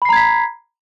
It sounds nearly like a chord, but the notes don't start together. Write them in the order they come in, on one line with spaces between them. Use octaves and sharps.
B5 C7 A#5 G#6 B6